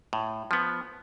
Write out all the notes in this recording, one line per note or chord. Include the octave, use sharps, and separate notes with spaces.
A2
F3 B3